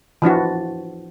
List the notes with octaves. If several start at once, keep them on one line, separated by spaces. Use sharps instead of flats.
E3 F3 D4 F#4